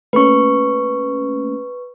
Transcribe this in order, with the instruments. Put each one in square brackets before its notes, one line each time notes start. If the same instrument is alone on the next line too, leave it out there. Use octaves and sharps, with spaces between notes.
[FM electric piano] A3 A#3 C#4 [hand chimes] B4 C#6